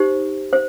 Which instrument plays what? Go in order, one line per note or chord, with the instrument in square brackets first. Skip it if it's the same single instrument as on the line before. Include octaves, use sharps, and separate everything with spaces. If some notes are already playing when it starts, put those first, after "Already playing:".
Already playing: [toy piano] D#4 G4 C5
C5